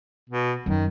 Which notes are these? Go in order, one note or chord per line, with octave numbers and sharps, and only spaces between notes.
B2
F#2 D#3